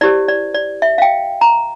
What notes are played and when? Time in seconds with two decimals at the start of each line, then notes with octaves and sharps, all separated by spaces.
0.01 E4 G4 C5 D5
0.28 D5
0.54 D5
0.82 E5
0.98 F5
1.02 G5
1.41 A#5